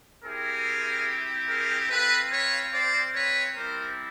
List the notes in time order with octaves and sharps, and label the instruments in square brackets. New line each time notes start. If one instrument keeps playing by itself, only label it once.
[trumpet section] C4 E4 G4 G#4 A#4
G#4 A#4
C4 F4 A4 B4
B4 C#5
C5 D5
B4 C#5
G3 C4 E4 A#4 C5